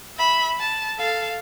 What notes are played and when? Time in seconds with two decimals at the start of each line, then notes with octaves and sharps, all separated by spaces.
0.17 E5 B5
0.59 A5
0.99 A4 F5